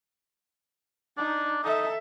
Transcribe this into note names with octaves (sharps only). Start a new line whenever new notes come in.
D4 D#4
D#4 A4 E5